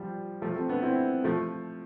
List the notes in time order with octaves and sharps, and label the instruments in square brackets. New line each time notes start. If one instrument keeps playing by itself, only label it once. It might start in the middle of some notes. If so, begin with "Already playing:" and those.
Already playing: [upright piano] F3 G3
F3 A3
A3 C4
B3 D4
C4 E4
F3 A3